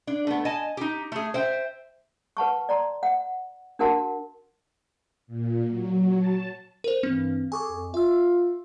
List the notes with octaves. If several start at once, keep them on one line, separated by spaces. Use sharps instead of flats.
D4
A3 B3
D#5 G#5 A5
D#4 G4
A3 G#4
C5 E5 G5
B4 F#5 A5 C#6
D5 A#5 C6
F#5
D4 F#4 A#4 F#5 A5 C6
A#2
F#3
A5
A#4 C5
G2 E3 C4
G#4 A4 G#5 C#6 D6
F2
F4 E5 E6